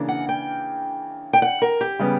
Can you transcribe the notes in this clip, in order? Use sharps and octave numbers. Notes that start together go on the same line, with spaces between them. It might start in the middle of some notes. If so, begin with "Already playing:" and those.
Already playing: C#3 E3 A#3 D4
F#5
G5
G5
F#5
A#4
G4
C#3 G3 B3